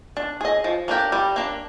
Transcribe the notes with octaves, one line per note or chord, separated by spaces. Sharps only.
D4
G#4 D#5
F3
A#3 D4 G4 A#4
G3
A#3 D4